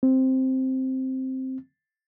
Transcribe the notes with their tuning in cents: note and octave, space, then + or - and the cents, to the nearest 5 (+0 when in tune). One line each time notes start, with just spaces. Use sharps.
C4 +0